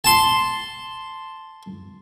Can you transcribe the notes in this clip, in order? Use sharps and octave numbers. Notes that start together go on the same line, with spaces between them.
A5 C6